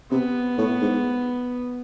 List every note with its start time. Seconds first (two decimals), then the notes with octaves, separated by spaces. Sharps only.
0.11 C3 B3
0.58 A2
0.81 G#2